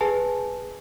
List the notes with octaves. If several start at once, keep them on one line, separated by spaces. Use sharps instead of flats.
G#4 B4 G#5 A5